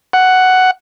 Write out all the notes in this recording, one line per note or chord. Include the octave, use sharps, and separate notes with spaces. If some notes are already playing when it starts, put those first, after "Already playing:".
F#5